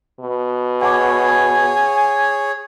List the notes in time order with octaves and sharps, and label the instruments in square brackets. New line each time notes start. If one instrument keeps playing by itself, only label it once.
[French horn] B2
[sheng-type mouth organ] G#4 C#5 [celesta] F#5 A5 D6 [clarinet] G#5